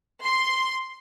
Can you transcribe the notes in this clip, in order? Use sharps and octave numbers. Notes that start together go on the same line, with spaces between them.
C6